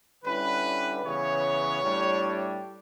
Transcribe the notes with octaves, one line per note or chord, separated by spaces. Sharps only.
D3 G3 C#4 E4 B4
C#3 E3 B3 C#5
A2 G3 D4